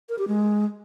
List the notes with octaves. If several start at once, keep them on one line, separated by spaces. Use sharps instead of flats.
A#4
G4
G#3